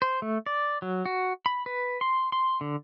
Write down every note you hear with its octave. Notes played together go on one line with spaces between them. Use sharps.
C5
A3
D5
F#3
F#4
B5
B4
C6
C6
D3